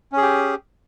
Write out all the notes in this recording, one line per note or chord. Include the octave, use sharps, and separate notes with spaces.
C#4 G4 G#4